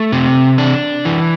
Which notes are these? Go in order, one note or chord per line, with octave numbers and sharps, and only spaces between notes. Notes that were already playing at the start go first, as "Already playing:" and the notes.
Already playing: A3
C3
D4
E3